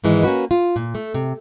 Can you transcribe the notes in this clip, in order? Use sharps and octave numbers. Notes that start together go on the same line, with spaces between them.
G#2 D#3 E3 G#3
A#3 C#4 D4 F#4 B4
F4
A#2
A3
C3